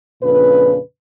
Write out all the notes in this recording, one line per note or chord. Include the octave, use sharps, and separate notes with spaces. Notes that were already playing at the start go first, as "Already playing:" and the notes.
F2 A#2 C#3 D4 B4